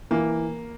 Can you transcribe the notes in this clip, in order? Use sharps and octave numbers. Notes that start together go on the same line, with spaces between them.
E3 A#3